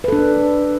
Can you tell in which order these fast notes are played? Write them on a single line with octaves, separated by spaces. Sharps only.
B4 A4 D4